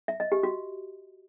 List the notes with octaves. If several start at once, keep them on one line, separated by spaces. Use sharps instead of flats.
E5
D#5
G4
F#4